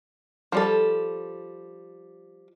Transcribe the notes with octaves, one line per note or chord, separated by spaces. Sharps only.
F3 G3 A4